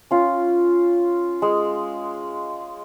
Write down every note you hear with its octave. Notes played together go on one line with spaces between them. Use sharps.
C#4 F4
G#3